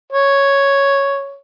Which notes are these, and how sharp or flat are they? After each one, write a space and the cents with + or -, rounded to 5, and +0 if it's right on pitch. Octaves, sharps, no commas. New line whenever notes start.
C#5 +0